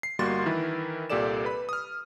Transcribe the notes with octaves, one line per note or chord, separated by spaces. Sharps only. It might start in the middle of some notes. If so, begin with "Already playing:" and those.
C7
G1 G3 A#3 F#4 C6 A6
D#3 E3 E4 A#4 B4
C2 A#2 G4 A4 D5 E7
B4 B5
D#6 F6